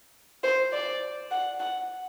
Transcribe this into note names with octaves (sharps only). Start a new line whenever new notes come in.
C5
D5
F#5
F#5